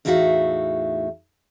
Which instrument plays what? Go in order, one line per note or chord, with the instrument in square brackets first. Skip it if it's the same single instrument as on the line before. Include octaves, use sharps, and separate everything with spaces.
[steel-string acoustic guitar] E2 A2 D#4 F#4 E5 F5